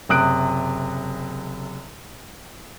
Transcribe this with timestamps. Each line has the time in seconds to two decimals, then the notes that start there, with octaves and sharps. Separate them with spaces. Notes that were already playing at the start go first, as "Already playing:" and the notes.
0.09 F#1 C3 D#6 F#6 D7